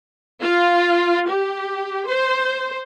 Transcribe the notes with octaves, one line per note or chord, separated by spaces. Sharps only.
F4
G4
C5